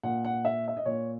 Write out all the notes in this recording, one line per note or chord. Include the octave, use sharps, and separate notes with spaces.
A#2 F#5
F#5
E5
E5
D#5
A#2 C#5